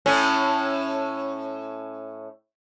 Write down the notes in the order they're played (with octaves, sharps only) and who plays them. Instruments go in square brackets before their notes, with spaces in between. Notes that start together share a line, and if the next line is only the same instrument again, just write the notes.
[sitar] A2 C#4